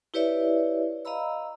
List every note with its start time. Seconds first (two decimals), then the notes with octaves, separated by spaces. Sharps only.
0.14 E4 G4 B4 C#5 D5 E5
1.05 D#5 F5 A#5 B5 E6